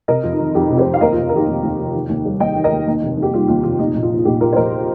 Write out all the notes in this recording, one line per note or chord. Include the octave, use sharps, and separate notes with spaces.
C3 A#4 D#5
F2 F4
D#4
D#3
F2 D#4 G4
C3
G4 C5
F2
F5
D#2 A#4 D#5
F4
F1
A#4
D#3 D#4 G4
F1
D#2
F1
D#3
D#2
G3
D#2 D#5 G5
D#3
A#4 D#5
D#2
D#2 D#4
F1
D#3
G4
G3 F4
D#2 F4
F1 F4
A#2 D#4
A#1
F4
F3
F4
A#1 D#4 G4
A#2 F4 A#4
C5
A#1 A#4 D#5